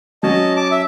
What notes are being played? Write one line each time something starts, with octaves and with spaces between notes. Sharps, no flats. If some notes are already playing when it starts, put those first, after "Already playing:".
F#3 C#4 D#5 A5
A5 D6
E5